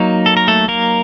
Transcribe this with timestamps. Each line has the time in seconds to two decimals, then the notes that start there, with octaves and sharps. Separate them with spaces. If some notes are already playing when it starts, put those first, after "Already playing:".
Already playing: F#3 A#3 D#4
0.26 A4
0.37 A#4
0.48 A3 A4
0.68 A#3 A#4